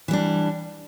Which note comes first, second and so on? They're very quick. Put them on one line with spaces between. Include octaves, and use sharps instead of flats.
E3 G3 D4